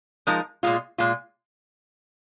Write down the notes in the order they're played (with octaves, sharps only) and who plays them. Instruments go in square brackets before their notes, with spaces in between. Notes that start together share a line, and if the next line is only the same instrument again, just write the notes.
[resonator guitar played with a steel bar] F3 G#3 D#4 A#4
A#2 G#3 F4
A#2 G#3 F4